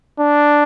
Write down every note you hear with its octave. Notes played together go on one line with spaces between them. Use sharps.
D4